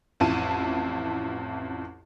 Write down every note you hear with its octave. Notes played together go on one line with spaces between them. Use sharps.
A1 F2 E4 A5 D#7